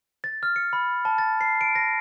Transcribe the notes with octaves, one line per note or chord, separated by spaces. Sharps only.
A6
F6
C#7
B5
A5
A6
C7
D7
A#6